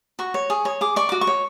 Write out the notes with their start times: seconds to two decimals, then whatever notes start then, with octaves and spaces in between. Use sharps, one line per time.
0.19 F#4 C#6
0.34 C#5
0.50 G#4
0.65 C#5
0.81 G#4 D6
0.96 D5 C#6
1.09 F#4 D6
1.21 C#6
1.27 C#5